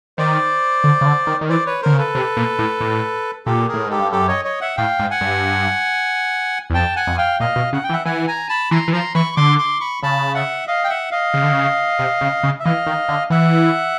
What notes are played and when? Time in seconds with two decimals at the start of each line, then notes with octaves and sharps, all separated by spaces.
0.18 D#3 C5 D5
0.84 D3
1.01 C#3
1.06 D3
1.27 D#3
1.41 D#3
1.49 E3 C5 D5
1.66 B4 C#5
1.82 D3 A#4 C5
1.93 C#3
1.98 A4 B4
2.15 C3
2.37 A#2
2.59 A2
2.81 A2
3.46 A#2 G4 A4
3.68 G#4 A#4
3.74 A2
3.87 G#2 G4 A4
3.99 G2
4.11 F#2 G4 A4
4.28 C#5 D#5
4.45 C#5 D#5
4.61 E5 F#5
4.77 A2 F5 G5
4.99 G#2
5.11 F#5 G#5
5.21 G2
6.70 E2
6.74 F2 G5 A5
6.96 F#5 G#5
7.07 F2
7.18 F5 G5
7.40 A#2 D#5 F5
7.56 B2
7.73 C#3 F#5
7.84 G5
7.89 E3
7.93 E5 F#5
8.05 E3 F#5 G#5
8.27 G#5 A#5
8.49 A5 B5
8.71 E3 A#5 C6
8.88 E3
8.93 F3 A#5 C6
9.14 E3 B5 C#6
9.36 D3 C6 D6
9.58 C6 D6
9.80 B5 C#6
10.03 C#3 A5 B5
10.35 E5 F#5
10.67 D#5 F5
10.84 G5
10.90 E5 F#5
11.11 D#5 F5
11.34 C#3
11.43 D3
11.52 C#3
11.99 C3
12.21 C#3
12.43 C#3
12.60 E5
12.64 E3 D#5 F5
12.87 D#3
13.09 D3
13.30 E3 E5 F#5